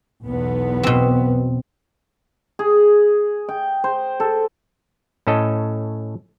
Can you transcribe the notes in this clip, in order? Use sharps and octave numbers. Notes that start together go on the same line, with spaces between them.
B1 E2 B3
B2 C4
G#4
G5
C5
A4
A2 C#4 A4 D#5